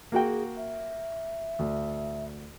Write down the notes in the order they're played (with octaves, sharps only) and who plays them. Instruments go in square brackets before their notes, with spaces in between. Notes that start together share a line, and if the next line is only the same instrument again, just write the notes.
[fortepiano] A#3 F#4 G5 [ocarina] G#4
[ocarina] E5
[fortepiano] D2